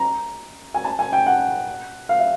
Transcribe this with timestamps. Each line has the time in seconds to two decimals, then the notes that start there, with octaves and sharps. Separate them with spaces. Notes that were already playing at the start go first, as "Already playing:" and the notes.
Already playing: A#5
0.74 G#5
0.84 A5
0.99 G#5
1.13 G5
1.26 F#5
2.09 F5
2.20 E5